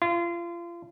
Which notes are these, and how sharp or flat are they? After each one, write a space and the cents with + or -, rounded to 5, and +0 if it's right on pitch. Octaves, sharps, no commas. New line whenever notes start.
F4 -30